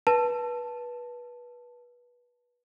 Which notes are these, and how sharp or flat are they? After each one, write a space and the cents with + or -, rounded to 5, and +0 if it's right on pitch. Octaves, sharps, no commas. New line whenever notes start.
B4 -25 A5 +0